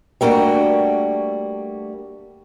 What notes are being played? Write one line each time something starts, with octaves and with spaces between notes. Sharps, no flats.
G3 A3 A#3 D4 F#4